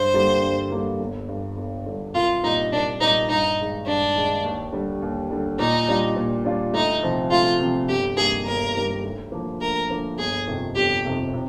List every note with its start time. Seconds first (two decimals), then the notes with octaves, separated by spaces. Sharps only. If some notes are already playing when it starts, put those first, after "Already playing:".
Already playing: G2 C5
0.14 D3 G3 A#3
0.43 G2
0.71 D3 G3 A#3
1.00 G1
1.28 G2 D3
1.57 G1
1.86 G2 D3
2.14 C2 F4
2.43 A#2 G3 A#3 D#4
2.71 C2 D4
3.00 A#2 G3 A#3 D#4
3.29 G2 D#4
3.58 D#3 G#3 D#4
3.87 G2 D4
4.16 D#3 G#3 D#4
4.44 D#2
4.72 D3 G3
5.02 D#2
5.30 D3 G3
5.59 A#2 D#4
5.88 G3 D4 F4
6.16 A#2
6.45 G3 D4 F4
6.73 D2 D#4
7.03 C3 F3 C4
7.31 D2 F4
7.60 C3 F3 C4
7.88 G1 G4
8.17 G2 D#3 G3 A#3 G#4
8.46 G1 A#4
8.75 G2 D#3 G3 A#3
9.03 D2
9.32 D3 F3 A#3
9.61 D2 A#4
9.89 D3 F3 A#3
10.19 G1 G#4
10.47 F2 C3 D#3
10.76 G1 G4
11.05 F2 C3 D#3
11.33 C3